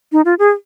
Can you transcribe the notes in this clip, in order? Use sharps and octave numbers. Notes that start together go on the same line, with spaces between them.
D#4
F4
G#4